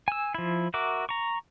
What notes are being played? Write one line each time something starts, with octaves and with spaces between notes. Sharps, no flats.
G#5 E6
F3 E4
F#4 A#4 E5 D6
A#5 C#6